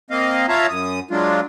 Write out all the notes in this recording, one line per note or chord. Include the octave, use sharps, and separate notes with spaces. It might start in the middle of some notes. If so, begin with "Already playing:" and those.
A#3 C4 D#5 F5
F4 C#5 E5 F5 A5 A#5
F#2 D#6
F#3 G#3 D4 F4